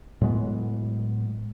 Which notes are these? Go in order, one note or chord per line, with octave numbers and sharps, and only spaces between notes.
A2 F#3 G#3 B3